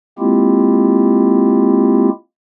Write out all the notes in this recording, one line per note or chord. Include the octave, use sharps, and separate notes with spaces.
G#3 A#3 C4 E4 F4 G4